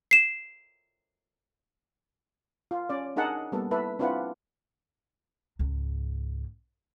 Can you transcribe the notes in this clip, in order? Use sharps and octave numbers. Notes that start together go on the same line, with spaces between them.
C7 E7
F4
C#4 D5
D4 D#4 G#4 A#4 F#5 A5
G3 A#3 B3 A4
E4 A4 B4 E5
C4 D4 E4 F4 B4 F#5
C#2 G#2